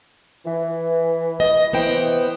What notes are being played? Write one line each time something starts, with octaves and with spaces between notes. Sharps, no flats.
E3
D#5
E3 B3 C5 G5